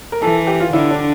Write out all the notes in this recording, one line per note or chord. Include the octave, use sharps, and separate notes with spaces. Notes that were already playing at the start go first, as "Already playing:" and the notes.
A#4
E3 A4
G4
F4
D3 E4
D4